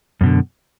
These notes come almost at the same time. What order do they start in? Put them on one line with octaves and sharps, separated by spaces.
F#2 B2 D3